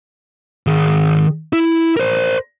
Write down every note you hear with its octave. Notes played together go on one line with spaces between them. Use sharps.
D#3 G#4
E4
A#4 C5